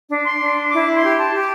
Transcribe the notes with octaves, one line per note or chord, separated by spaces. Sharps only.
D4
C6
D4
E4 D6
C6
G4
A5
G4